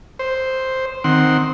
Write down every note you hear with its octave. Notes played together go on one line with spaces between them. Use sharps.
C5
D#3 C4 F#5 C6